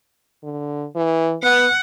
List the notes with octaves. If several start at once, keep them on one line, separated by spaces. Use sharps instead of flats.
D3
E3
B3 F#5